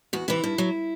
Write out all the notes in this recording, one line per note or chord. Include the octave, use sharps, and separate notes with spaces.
E2 F#4
C3 E3 E4
G2
F#3